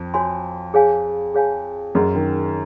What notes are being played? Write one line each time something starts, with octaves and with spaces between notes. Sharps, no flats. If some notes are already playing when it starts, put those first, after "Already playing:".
Already playing: F2
F#4 C#5 G#5 C6
G#4 C#5 F5 G#5
G#4 C#5 F5 G#5
F#2 G#4 D#5 F#5 C6
D#3